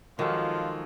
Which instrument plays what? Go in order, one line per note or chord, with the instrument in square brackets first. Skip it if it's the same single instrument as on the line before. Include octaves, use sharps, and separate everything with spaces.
[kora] D#3 A4 [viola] F3 [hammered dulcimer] F#3 G#3 D6 [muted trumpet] F4